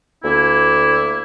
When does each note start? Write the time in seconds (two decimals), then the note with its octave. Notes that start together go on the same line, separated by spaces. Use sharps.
0.24 D2 A#3 E4